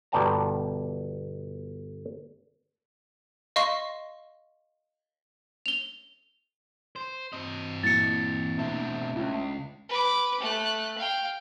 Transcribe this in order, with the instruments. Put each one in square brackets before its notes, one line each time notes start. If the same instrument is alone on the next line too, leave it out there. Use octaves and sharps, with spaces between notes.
[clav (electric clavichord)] G1 B2 D5 G5 A5 A#5
[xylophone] D#5 F5 C6 C#6
F7 G7
[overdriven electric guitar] C5
C4 D#5
[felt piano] A#2 E3 F#3 [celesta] A6 C#7
[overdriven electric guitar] B2 C4 [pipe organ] A3 D4
[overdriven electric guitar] C#2 [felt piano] C#4 F4
[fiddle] B4 D6
A3 F#6
F5 G5